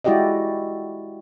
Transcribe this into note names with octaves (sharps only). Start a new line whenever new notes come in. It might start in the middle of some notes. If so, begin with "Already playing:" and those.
G#3 E4 F#4 G4 D5 D#5